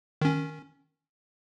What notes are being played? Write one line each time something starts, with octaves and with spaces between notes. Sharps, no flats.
D#3 C#4